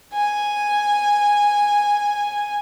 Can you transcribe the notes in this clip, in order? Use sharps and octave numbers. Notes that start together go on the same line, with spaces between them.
G#5